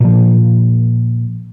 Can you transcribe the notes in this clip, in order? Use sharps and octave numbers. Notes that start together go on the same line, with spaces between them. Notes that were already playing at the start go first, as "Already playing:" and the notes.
A#2 F3